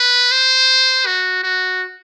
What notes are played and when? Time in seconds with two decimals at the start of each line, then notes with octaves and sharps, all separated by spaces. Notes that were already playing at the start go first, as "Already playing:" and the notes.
Already playing: B4
0.32 C5
1.06 F#4
1.44 F#4